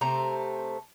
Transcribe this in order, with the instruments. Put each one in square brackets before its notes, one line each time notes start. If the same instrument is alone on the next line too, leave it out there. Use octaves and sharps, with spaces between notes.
[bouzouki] C3 A3 C5 A#5